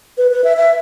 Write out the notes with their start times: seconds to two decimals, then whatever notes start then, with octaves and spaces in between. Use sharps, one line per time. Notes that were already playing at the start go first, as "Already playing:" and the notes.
0.18 B4
0.31 B4
0.44 E5
0.57 E5